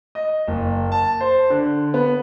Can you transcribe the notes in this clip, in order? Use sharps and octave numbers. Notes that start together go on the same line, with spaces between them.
D#5
F#1
A5
C5
D3
B3